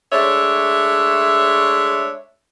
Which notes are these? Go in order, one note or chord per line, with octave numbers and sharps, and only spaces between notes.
G#3 A3 D4 C#5 E5